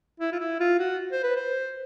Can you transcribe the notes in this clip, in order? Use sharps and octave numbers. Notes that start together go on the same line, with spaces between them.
E4
F4
E4
F4
F#4
C5
B4
C5